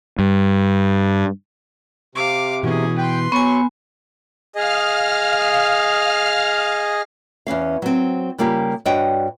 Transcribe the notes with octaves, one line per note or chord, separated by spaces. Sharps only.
G2
C3 F5 D6
B2 E3 C#4 G#4
B4 G5 C6
F#3 B3 G#5 C#6
G#4 D#5 F5 F6
E2 C#3 C#4 F5
F#3 C4
C#3 G3 A#3 F4 G4
G2 D4 F#4 C#5 D#5 G5